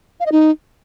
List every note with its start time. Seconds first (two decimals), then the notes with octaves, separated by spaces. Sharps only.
0.20 F5
0.26 D#5
0.32 D#4